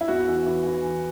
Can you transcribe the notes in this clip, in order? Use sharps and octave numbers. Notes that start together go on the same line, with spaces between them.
E4
E2 F#4
E3
E3
E3